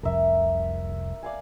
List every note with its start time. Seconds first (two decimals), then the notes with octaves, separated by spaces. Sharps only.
0.03 F1 C2 F2 A#4 E5
1.23 D5 F5 G#5